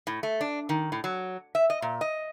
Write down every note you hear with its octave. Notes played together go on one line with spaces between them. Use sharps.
A2
A3
D4
D#3
A2
F#3
E5
D#5
A#2
D#5